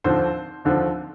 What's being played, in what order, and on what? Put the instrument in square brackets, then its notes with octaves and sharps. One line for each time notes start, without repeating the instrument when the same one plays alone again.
[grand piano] D#2 D3 F3 C4 C5
D#2 D3 F3 C4